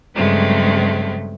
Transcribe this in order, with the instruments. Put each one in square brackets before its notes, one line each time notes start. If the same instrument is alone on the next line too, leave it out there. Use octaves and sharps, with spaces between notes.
[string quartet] G2 C#3 F#3 G#3 A3 C4